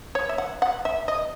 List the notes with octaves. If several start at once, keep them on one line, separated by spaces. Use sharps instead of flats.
C#5
E5
F#5
F#5
E5
D#5